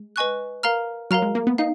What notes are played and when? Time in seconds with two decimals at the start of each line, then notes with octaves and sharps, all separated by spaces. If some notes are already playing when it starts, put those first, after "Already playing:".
Already playing: G#3
0.16 B4 D#5 G#5 C#6 F#6
0.63 A#4 F5 A#5 F6
1.11 F#3 A#4 F5 A#5 F6
1.22 G#3
1.35 A#3
1.47 B3
1.58 D#4 F5